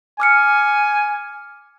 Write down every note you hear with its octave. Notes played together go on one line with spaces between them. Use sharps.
G#5 D6 F6 C#7